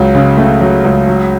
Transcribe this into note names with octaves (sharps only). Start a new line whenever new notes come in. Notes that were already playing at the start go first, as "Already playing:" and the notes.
Already playing: C#2 F#3
C#3
A3
F#3
C#2
F#3